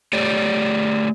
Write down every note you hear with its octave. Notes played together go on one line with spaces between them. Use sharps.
A3 G4 C#5 D5